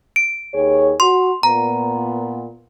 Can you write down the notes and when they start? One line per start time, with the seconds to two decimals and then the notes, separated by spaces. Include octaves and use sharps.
0.16 D7
0.53 D#2 G#4 C#5
1.00 F#4 C6
1.43 A#2 B3 A#5